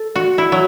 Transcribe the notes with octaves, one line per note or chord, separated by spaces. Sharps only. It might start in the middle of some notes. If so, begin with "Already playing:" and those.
Already playing: A4
F#4
E4
F#3